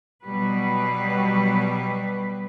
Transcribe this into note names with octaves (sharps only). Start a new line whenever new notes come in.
B2 F#3 G3 B4